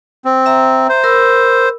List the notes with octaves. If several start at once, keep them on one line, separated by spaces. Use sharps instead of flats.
C4
E5 A#5
C5
A#4 B5 E6